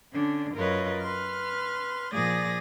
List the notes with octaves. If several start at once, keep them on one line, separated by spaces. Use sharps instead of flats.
D3 C#4 D4
F#2 F4 A#4 B4 C#5 D#5
B4 C6 F6
A#2 F3 G#4 D5 D#6 A#6